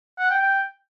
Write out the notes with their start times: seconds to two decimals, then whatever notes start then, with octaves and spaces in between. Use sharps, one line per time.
0.19 F#5
0.30 G5
0.42 G5